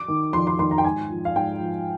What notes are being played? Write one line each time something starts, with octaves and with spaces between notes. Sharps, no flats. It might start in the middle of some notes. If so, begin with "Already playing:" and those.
Already playing: D6
D#3
F2 C6
C6
D#3 C6
A#5
G5
G#2 G#5
F3
F5
G#2 G5
F3